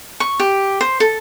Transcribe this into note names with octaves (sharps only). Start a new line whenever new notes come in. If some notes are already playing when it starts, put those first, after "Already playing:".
C#6
G4
C5
A4